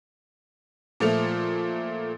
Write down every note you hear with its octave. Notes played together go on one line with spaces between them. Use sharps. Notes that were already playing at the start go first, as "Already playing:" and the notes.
A#2 F3 A3 F7